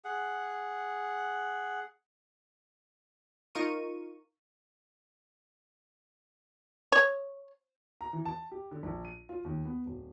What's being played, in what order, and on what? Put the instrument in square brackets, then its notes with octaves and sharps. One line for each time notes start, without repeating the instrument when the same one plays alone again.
[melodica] G#4 F#5
[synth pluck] D#4 F4 A#4 C#6 D#7
[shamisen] C#5
[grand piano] A#5
E3
A5
G4
D3
A#1
D#7
F4
D#2
B3
D1